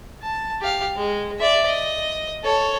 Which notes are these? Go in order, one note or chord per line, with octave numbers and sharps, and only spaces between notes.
A5
G4 F5
G#3
D5 E5
D#5
A4 C#5